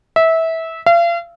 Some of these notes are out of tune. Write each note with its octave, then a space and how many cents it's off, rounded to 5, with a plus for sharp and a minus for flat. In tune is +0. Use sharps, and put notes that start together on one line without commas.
E5 -20
F5 -40